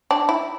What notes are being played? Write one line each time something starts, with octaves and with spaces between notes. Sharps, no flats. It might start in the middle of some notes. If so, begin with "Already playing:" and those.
D4
E4